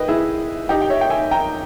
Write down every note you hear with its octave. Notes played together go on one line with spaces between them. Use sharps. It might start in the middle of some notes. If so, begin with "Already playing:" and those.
Already playing: B4 D#5 G5
E4 G#4
D#4 G4
G5
C#5 E5
G5
E5 G#5
G5 A#5